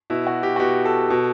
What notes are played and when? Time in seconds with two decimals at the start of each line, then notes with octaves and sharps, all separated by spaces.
0.10 B2 E4
0.27 F#4
0.43 G4
0.56 F#4
0.60 B2 G4
0.86 A4
1.10 B2